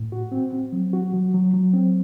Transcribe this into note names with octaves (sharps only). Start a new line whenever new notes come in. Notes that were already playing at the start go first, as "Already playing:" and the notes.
Already playing: A2
F#4
C4
C4
F#3
F#4
F#3
F#3
F#3
C4